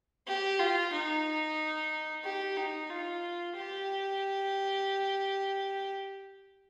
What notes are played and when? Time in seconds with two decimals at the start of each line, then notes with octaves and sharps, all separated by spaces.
0.27 G4
0.60 F4
0.93 D#4
2.24 G4
2.57 D#4
2.90 F4
3.56 G4